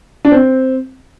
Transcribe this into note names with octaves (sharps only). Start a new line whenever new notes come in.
D4
C4